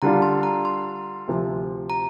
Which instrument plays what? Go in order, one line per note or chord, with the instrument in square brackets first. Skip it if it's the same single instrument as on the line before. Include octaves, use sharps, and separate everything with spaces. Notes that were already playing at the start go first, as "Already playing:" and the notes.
[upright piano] D3 G3 D4 F4 [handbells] A#5
[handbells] C6
A#5
C6
[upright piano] D2 C3 F3
[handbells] A#5